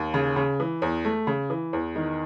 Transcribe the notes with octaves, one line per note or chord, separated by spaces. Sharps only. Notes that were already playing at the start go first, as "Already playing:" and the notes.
Already playing: D#2
C#3
C#3
E3
E2
A3
C#3
E3
E2
D#3